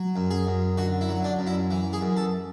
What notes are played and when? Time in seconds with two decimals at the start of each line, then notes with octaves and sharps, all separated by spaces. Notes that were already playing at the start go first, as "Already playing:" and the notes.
Already playing: F#3
0.16 F#2
0.31 G#4
0.47 F#2
0.77 D3 F#4
1.01 E4
1.09 F#3
1.24 D4
1.39 F#2
1.47 E4
1.70 E3
1.93 G#4
2.01 F#2
2.17 A4